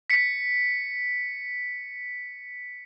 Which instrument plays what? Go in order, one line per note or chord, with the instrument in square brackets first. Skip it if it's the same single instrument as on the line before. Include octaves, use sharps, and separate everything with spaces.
[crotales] B6 C#7